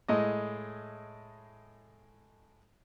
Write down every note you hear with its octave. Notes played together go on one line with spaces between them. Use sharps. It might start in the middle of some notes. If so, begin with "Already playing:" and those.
A2 G#3 D#5